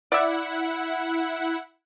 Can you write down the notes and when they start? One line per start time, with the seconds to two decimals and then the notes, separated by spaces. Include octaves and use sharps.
0.12 E4 D5 E5 F#5